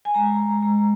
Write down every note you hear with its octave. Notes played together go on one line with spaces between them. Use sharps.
G#5
G#3 A#5
G#3